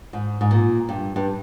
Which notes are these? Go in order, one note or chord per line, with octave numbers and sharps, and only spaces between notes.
G#2
G#2
A#2
G2
G2